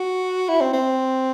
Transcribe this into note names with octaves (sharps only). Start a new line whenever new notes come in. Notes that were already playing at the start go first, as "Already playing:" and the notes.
Already playing: F#4
E4
C4
C4